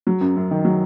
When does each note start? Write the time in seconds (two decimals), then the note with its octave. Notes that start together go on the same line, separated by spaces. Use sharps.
0.07 F#3
0.21 F#2
0.36 F#2
0.51 D#3
0.65 F#3